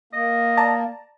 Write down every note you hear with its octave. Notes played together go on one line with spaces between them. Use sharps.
A#3 D#5
D5 A5 A#5